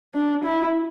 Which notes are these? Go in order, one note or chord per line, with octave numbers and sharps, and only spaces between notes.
D4
E4